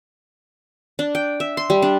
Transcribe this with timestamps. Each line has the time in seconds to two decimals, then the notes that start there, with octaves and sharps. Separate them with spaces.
0.99 D4
1.15 G5
1.40 E5
1.57 C6
1.70 G3
1.82 D4